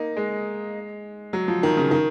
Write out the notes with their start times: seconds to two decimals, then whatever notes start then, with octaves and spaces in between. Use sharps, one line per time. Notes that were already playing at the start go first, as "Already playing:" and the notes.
Already playing: A#3 D#4
0.17 G#3
1.33 F#3
1.48 F3
1.63 D#3
1.77 C#3
1.91 D#3